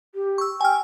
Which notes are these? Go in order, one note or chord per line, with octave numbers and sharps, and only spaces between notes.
G4
C#6 E6
G5 G#5 F6